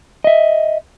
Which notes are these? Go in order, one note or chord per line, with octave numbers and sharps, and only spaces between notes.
D#5 E5